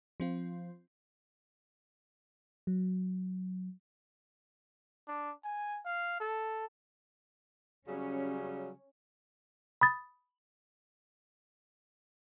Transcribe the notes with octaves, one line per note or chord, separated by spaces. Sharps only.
F3 C4 F4
F#3
D4
G#5
F5
A4
C#3 F#3 G3 C#4
B5 D#6 A6